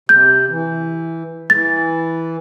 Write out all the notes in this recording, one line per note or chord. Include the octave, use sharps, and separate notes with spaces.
C3 G6
E3
E3 A6